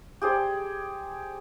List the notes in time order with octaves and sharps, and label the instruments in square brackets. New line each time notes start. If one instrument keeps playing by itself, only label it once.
[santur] G4 G#4 C5 D5